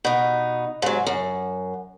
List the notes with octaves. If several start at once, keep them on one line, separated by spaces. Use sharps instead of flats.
B2 D#4
G#2 F#3
F#2